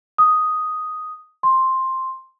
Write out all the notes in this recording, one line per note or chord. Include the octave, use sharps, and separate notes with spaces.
D#6
C6